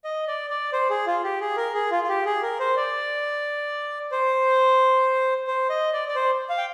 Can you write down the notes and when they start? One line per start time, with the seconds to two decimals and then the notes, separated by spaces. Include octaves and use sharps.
0.04 D#5
0.28 D5
0.50 D5
0.73 C5
0.90 G#4
1.06 F4
1.24 G4
1.41 G#4
1.57 A#4
1.74 G#4
1.91 F4
2.03 F4
2.09 G4
2.26 G#4
2.43 A#4
2.59 C5
2.76 D5
4.11 C5
5.47 C5
5.70 D#5
5.93 D5
6.08 D5
6.15 C5
6.49 F5
6.58 G5